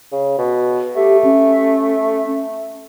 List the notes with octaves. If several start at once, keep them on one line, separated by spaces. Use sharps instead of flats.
C#3
B2
A3 G4
C#4